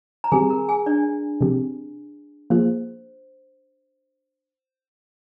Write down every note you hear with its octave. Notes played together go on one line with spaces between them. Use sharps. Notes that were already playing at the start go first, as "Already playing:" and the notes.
A#5
D#3 G3 C4 G4 G#4 G#5
A#4 A#5
G#4 G#5
D4 D5
C3 F3 C4 G4
F3 A#3 F4 G#4 C5